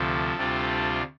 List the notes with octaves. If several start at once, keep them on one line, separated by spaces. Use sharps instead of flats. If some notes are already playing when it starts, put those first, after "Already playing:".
Already playing: D2 C3 F3 A4
D2 C3 G3 D4 F4